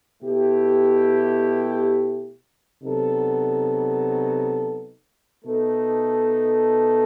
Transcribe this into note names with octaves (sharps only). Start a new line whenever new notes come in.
B2 A3 E4 G4
C3 F#3 B3 D#4 A4
B2 A3 D#4 A4